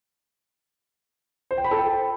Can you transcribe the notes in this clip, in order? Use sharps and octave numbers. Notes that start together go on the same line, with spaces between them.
C5
G5
B5
A4
G5